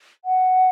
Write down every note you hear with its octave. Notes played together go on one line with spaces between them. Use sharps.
F#5